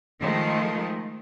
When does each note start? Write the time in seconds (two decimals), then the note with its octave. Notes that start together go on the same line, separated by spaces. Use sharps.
0.20 D#3 F3 G#3 A3